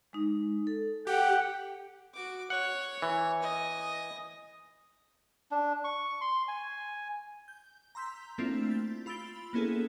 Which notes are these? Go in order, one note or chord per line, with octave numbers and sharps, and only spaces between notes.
G#3 D#4
A4
G4 F#5 G5
F#4 D6
C#5 F#5
E3
D#5 G#5
D4
C#6
C6
G#5
G6
A#5 C6 E6 G6 B6
A3 A#3 C4 D4 E4 F4
G6 A6 B6
F4 B5 E6 A6 D7 G7
A#3 B3 C#4 E4 G#4 A4